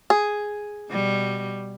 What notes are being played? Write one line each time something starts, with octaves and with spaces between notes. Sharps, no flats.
G#4
B2 G3